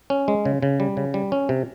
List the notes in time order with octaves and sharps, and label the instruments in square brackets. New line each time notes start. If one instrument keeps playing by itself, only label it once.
[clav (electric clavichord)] C#4
G#3
C#3
C#3
G3
C#3
G3
C#4
C3